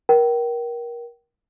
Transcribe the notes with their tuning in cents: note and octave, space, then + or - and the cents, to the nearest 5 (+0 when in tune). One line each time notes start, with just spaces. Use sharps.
A#4 +25 G5 -30